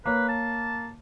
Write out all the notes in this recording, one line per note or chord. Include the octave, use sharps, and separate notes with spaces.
A#3 B4 C#5
A5